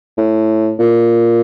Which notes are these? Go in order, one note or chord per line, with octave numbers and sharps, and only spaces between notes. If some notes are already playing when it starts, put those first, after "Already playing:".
A2
A#2